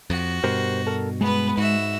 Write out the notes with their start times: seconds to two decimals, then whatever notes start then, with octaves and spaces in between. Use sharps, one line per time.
0.10 F2 F#4
0.44 G2 B2 G4 A#4 C5
0.87 A4 A#4
1.21 G#3 B3 B4
1.58 G#2 F#4 E5